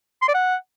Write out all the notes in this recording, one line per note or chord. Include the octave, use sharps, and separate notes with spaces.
C6
D5
F#5